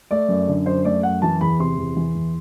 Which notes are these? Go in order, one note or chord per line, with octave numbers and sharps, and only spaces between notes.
A3 D5
F#2
D3
F#2 C5
A3 D5
F#2 F#5
E3 A5
E2 B5
C3 C6
E2
E3
E2